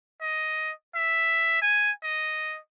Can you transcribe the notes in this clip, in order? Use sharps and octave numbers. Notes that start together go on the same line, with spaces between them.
D#5
E5
G#5
D#5